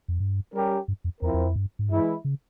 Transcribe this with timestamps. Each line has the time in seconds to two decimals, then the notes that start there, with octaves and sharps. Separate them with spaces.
0.08 F2
0.20 G2
0.53 G3 C#4 G4 A#4
0.88 G2
1.04 F2
1.21 E2 F3 C4 E4 A#4
1.34 E2
1.45 F2
1.56 G2
1.79 G#2
1.89 G2 E3 G#3 E4
2.25 C#3